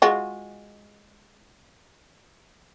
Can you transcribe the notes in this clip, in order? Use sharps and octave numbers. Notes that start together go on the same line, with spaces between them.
G#3 F4 F#4